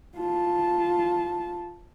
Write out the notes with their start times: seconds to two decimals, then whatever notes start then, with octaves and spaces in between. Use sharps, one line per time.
0.17 F4 A5